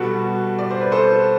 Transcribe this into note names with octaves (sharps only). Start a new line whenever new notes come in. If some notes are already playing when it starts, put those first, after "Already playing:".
Already playing: B2 G3 B3 F#4 A4
D5
C5
B4
A4 C5